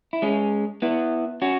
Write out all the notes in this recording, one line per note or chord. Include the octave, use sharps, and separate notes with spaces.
E4
G#3 C#4
B3 E4
C#4 F#4